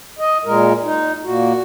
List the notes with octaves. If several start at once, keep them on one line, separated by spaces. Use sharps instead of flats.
D#5
A#2 G#3 A#4
D#4
A#2 A#3 F#4